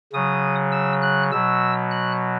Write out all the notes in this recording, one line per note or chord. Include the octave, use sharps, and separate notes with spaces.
C#3 F#3 D#6
E6
F#6
B2 F#3 E6
F#6